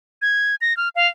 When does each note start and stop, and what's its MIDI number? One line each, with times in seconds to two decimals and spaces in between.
0.22 0.55 92
0.61 0.76 94
0.77 0.89 89
0.96 1.07 77